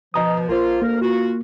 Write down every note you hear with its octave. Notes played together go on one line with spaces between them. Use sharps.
B2 F3 D#5 A#5 D#6
A#1 A#3 F4 C5
D2 A#3 A#4
F4 F#4